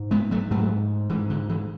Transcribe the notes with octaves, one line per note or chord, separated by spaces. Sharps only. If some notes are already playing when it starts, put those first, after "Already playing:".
Already playing: G#2
G#3 B3
F#3 A3
G#2 F#3 A3
G#2 E3
D3
E3